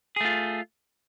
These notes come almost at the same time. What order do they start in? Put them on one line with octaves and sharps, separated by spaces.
G#4 A3 F4